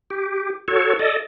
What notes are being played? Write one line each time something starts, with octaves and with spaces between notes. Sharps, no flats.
G4
F#4 A4 C#5
A4 D5 D#5